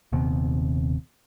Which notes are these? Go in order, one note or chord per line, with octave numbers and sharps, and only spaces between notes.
D#1 D#2 C3 B3